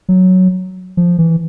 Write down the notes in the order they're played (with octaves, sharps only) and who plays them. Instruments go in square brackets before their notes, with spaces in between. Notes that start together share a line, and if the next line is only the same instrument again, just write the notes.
[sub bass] F#3
F3
E3